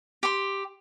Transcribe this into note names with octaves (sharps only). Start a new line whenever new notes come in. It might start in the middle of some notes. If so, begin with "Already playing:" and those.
G4 C6